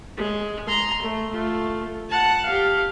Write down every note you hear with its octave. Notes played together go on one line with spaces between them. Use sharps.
G#3
A#5 C6
A3
A3 F4
F#5 A5
G4 F5